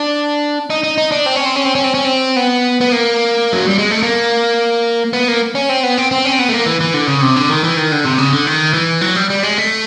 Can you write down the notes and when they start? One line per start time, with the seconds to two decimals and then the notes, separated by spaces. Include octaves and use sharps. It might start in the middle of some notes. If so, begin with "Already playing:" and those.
Already playing: D4
0.70 D#4
0.84 D#4
0.98 D#4
1.12 D4
1.26 C4
1.36 C#4
1.45 C4
1.56 C#4
1.65 C4
1.75 C#4
1.84 C4
1.94 C#4
2.04 C4
2.36 B3
2.81 B3
2.92 A#3
3.53 F#3
3.65 G3
3.78 G#3
3.91 A3
4.03 A#3
5.13 B3
5.28 A#3
5.55 C#4
5.69 C4
5.83 B3
5.97 C4
6.11 C4
6.25 C#4
6.32 C4
6.39 B3
6.49 A3
6.53 A#3
6.66 E3
6.81 E3
6.94 D3
7.08 C#3
7.22 C3
7.36 D3
7.49 D#3
7.64 E3
7.77 D#3
7.92 D3
8.05 C3
8.18 C#3
8.33 D3
8.47 D#3
8.73 E3
9.01 F#3
9.16 G3
9.30 G3
9.43 G#3
9.58 A3